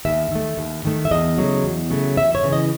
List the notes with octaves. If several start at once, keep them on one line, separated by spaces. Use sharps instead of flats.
D#2 E5
D#3 A3
D#2
D#3 A3
E5
E2 D#5
C#3 F#3 A3
E2
C#3 F#3 A3
E2 E5
C#5
C#3 E3
D#5